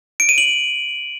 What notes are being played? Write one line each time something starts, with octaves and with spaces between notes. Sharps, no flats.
D7
D#7
F#7